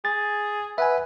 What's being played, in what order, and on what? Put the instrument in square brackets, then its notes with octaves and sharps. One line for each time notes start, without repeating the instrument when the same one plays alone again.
[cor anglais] G#4 [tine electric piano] A6
[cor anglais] B4 [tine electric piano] E5 F#5 G#5